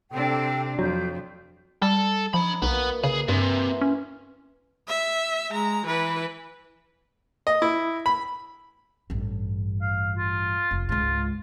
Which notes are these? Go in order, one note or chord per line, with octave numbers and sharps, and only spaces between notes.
C3 C4 D4 A4 G5
F2 F#3 G6
G3 A4
F3 D4 D#4 B5
B1 A#3 B3 F#4 B4
C#3 G#4
G2 C3 E3 C6
C#4
E5
G#3 A#5
E3 B4
D#5
E4
B5
A1 G2
F5
F4
F1
C#2 G#2 F4